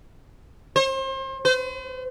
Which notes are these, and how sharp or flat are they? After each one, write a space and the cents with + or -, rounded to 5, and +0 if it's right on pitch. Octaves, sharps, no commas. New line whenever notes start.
C5 +35
C5 -45